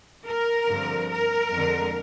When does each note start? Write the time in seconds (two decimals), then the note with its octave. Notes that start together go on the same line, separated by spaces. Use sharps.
0.27 A#4
0.69 G2 D3 F3 C4
1.10 A#4
1.52 F2 D3 G#3